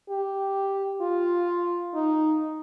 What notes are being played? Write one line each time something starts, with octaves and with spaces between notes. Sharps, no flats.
G4
F4
D#4